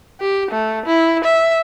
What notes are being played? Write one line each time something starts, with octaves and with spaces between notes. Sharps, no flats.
G4
A3
E4
E5